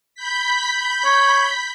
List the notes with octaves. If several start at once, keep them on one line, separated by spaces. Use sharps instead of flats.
B5 G6 B6
C#5